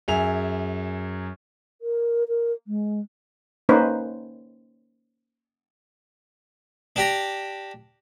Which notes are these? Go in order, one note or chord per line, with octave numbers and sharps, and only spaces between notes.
F#2 G#4 E5 F7
A#4
A#4
G#3
A#3 C#4 D#4 B4 C5
D4 G4 A#5